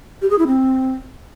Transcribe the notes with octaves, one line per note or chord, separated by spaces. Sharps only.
G4
G#4
E4
C4